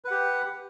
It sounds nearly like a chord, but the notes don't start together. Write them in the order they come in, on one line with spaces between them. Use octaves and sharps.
B4 F#5 G4